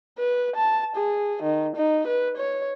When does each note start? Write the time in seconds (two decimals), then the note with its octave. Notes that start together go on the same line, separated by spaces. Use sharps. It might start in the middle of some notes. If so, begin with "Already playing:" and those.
0.18 B4
0.56 A5
0.96 G#4
1.43 D#3
1.77 D#4
2.07 B4
2.37 C#5